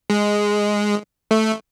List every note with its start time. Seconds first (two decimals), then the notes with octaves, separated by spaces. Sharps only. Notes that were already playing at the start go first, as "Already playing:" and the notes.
0.10 G#3
1.31 A3